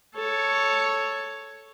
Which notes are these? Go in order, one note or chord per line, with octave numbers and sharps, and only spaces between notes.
A4 C#5